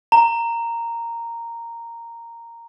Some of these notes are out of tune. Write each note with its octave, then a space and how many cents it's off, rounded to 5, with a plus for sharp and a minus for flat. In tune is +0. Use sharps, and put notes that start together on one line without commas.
A#5 -5